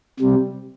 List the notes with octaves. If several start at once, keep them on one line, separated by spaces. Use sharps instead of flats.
C3 G3